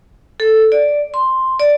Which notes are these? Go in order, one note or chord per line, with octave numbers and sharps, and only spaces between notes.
A4
D5
C6
D5